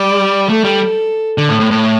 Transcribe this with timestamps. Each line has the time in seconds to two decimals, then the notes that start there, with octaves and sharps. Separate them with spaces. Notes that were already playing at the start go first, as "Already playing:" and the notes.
Already playing: G3 D5
0.49 A3 A4
0.64 G3
1.38 D3
1.49 A2
1.60 A2
1.71 A2